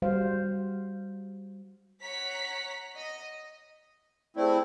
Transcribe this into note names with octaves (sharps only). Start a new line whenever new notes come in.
G3 F#4 C5 F5
C#5 F#5 A#5 B6
D#5
A3 C4 E4 G#4 C5 D5